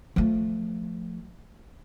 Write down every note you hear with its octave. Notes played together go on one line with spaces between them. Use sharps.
F3 A3